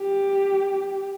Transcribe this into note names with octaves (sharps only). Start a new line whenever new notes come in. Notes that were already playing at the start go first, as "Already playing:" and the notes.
Already playing: G4